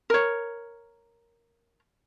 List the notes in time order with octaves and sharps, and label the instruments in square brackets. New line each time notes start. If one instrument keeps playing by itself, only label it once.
[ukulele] A#4 C#5